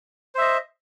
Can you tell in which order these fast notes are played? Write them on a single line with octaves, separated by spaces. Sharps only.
C5 E5 D#5